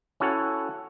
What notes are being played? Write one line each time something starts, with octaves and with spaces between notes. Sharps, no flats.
C#4 E4 F#4 A4 C#5 F#5